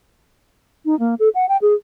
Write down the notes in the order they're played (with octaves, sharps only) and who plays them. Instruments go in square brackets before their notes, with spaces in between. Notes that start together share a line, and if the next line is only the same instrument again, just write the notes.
[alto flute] D#4
A#3
A4
F#5
G5
G#4